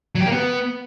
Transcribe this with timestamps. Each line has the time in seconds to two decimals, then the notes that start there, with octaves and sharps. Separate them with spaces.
0.15 F#3
0.21 G4
0.26 A#3
0.31 B3